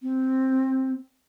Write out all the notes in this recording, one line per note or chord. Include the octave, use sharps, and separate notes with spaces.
C4